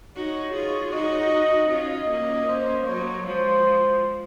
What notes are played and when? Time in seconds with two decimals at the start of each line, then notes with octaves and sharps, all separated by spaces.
0.16 D#4 F#4 C#5
0.54 F4 G#4
0.93 D#4 F#4 D#5
1.70 C#4 F4 D#5
2.09 A#3 C#4
2.48 C5
2.87 F#3 A#3 C#5
3.25 F3 G#3 C5